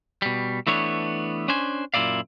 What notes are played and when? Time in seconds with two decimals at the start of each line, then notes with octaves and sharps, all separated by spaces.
0.22 B2 G3
0.67 E3 A3 B3 D4 C#5
1.48 C#4 D4 C5 G#5
1.94 F#2 A#2 E4 D5 F5